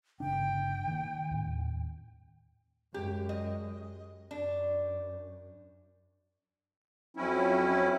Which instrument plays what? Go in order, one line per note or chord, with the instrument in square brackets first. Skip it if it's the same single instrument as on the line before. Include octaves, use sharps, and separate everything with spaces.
[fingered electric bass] G1 C#3 D4 [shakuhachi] G5
[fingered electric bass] D#3 A#3
D#2 A2
[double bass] F#2 G#3 [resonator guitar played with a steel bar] G4
[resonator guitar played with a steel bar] D#5
[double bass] F#2 [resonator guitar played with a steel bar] D4
[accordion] F2 C#4 E4 [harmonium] F#3 C4